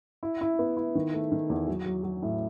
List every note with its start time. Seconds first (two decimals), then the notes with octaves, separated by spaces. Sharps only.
0.23 E4
0.41 E4
0.59 B3
0.77 E4
0.95 D#3
1.13 A3
1.32 D#3
1.50 E2
1.67 F#3
1.86 F#3
2.04 F#3
2.22 A2